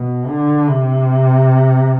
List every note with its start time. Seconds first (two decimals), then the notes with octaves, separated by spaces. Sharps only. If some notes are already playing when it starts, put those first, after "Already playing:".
Already playing: B2
0.28 D3
0.68 C3